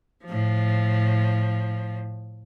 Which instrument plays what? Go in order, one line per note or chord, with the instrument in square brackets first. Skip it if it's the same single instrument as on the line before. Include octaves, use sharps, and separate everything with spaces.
[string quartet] A2 F3